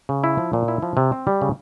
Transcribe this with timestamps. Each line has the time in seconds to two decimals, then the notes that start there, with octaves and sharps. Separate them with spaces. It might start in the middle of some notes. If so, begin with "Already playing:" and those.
0.09 C#3
0.24 E4
0.38 F3
0.53 A#2
0.68 E4
0.82 F3
0.97 C3
1.12 C4
1.27 G3
1.42 C#3